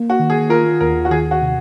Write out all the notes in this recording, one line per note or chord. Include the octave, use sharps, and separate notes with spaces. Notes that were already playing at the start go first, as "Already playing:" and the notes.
Already playing: A#3
F#4
D#3
G#4
F4 A#4
D#2 A#4
F#4
D#3 G#4
F#4
C3